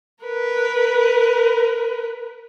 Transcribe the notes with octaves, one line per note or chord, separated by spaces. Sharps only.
A#4 B4